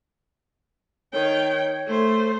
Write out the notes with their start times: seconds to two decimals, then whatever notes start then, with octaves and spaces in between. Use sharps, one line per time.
1.13 D#3 C#5 G5
1.86 A3 C5